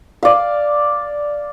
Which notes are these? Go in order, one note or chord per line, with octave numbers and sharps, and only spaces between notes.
D5 F5